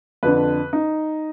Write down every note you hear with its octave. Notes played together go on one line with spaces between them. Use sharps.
F2 D3 B4
D#4